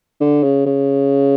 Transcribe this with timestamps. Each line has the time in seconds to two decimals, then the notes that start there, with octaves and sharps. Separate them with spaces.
0.21 D3
0.44 C#3
0.66 C#3